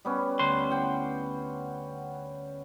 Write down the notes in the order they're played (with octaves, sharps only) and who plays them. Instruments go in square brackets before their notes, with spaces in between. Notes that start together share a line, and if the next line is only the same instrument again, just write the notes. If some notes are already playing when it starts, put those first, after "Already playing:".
[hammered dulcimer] G3 B3 C#4
[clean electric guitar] D2 B4 C6
[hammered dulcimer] F#5 G5